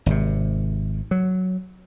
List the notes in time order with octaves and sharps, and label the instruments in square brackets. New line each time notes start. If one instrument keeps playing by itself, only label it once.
[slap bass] G#1 C3
F#3